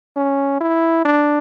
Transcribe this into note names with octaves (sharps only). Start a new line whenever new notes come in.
C#4
E4
D4